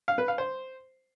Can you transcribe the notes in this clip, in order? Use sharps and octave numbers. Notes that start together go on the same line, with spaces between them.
F5
B4
F5
C5